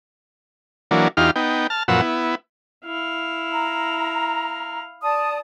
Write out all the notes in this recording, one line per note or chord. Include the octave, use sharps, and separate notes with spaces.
E3 F#3 A#3 D4
E2 D#4 F4 G4 F6
B3 D#4 G5
A5 F6
F#2 A#2 F3 B4 F#5 E6
B3 E4
E4 F5
A#5
D5 A5 D#6